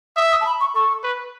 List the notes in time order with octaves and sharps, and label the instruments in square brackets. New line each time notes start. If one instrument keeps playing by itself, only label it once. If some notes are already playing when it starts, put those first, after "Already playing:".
[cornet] E5 [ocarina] D#6
[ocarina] D#6
A5
B5
C#6
[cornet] A4 [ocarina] C#6
[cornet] B4